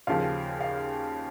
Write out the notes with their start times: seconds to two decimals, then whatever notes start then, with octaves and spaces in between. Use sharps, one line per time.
0.07 D#2 C#3 F3 F5
0.61 F5